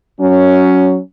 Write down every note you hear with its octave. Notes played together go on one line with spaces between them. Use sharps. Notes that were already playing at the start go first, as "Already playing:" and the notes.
F#3 C#4